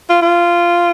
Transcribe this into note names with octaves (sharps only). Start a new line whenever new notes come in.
F4
F4